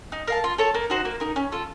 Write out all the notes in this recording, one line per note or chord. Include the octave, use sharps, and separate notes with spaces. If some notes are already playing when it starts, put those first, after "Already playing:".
D#4
A#4 F5 A5
F4
A4 C#5 A5
A#3
D#4 F#4 C5
A#3
D#4 A#4
C#4
F4 A4